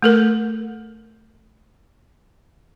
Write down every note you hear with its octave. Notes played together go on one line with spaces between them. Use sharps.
A3 A4 A#4